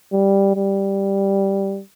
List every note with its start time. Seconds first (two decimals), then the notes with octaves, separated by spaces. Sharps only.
0.13 G3
0.56 G3